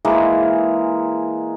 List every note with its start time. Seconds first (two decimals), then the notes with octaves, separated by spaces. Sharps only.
0.05 E3 G#3 A#3